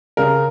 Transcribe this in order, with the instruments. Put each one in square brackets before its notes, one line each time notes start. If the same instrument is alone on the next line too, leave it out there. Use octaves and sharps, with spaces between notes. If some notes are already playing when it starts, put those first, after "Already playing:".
[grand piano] C#3 A#4